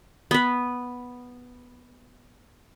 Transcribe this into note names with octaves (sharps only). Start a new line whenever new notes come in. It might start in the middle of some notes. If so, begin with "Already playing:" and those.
B3 B4